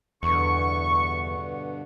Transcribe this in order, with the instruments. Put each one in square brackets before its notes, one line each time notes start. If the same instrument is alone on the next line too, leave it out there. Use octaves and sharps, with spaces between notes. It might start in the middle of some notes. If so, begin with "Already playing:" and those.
[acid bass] E2 [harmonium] G2 B2 D3 [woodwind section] C#6